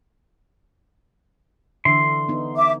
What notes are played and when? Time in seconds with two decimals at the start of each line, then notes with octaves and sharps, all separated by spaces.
1.85 D3 E3 E5 C6
2.29 B3 D#4
2.56 E5 D6